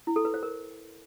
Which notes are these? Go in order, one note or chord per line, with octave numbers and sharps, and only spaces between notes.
E4
A4
B4
C5
A#4